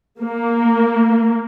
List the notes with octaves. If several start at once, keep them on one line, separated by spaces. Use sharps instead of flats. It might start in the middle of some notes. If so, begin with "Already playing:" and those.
A#3